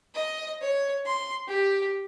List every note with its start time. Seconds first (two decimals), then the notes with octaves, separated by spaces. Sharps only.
0.14 D#5
0.61 C#5
1.05 C6
1.47 G4